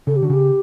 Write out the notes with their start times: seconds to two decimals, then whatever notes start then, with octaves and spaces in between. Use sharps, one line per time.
0.07 C#3 A4
0.16 G4
0.23 D3 F#4
0.30 C#3 G4